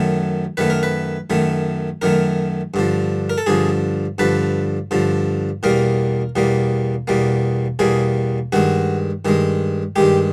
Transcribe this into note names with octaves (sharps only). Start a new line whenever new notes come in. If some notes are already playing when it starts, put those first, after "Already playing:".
Already playing: F#2 D#3 F#3 A3
F#2 D#3 F#3 A3 B4
A#4
B4
F#2 D#3 F#3 A3
F#2 D#3 F#3 A3 A#4
G2 D3 F3
A#4
A4
G2 D3 F3 G#4
G2 D3 F3 B4
G2 D3 F3
E2 B2 G3 A#3 A#4
E2 B2 G3 A#3
E2 B2 G3 A#3
E2 B2 G3 A#3 G#4
G2 D#3 G#3 F#4
G2 D#3 G#3
G2 D#3 G#3 G4